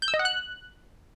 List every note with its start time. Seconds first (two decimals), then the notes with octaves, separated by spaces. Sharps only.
0.02 G6
0.08 E6
0.14 D#5
0.19 F#5
0.25 F#6